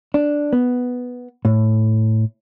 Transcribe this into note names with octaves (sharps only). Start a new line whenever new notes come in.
D4
B3
A2